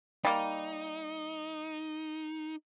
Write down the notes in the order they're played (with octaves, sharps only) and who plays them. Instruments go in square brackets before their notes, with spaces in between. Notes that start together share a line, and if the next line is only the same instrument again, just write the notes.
[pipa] G3 A#3 [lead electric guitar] D#4